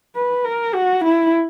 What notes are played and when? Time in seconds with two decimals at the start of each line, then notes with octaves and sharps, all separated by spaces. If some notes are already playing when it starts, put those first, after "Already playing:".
0.15 B4
0.45 A#4
0.74 F#4
1.04 E4